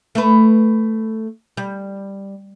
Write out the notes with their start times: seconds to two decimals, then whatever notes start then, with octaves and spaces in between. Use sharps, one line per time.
0.15 A3 B4
1.57 G3